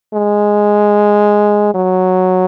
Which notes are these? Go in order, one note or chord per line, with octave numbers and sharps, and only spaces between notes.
G#3
F#3